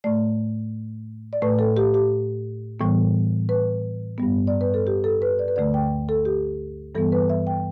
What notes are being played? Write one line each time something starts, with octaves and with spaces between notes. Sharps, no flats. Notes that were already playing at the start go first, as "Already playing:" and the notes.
A2 A3 D5
D5
A2 A3 B4
A4
G4
G4
A2 E3 G3 B3
B4
G2 G3 B3
D5
B4
A4
G4
A4
B4
D5
B4
D2 D3 A3 D5
G5
A4
G4
G2 E3 G3 B3 A4
B4
E5
G5